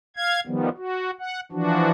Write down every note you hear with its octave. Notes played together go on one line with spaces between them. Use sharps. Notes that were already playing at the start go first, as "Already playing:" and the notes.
F5 G#6
D#3 F3 G3 B3
F#4
F#5
E3 F3 D4 F#4